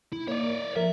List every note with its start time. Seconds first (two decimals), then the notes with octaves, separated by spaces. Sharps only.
0.13 E4
0.28 A#3 C#5 D5
0.76 F3 A#4 E5